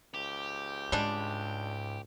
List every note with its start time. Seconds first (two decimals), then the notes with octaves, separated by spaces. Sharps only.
0.14 C#2 G4
0.92 G#2 G3 G#3 D4